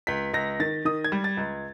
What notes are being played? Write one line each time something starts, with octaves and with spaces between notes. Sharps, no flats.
C#2 B6
C#2 A#6
D#3 A6
D#3 D#6
G#6
G3
A6
C#2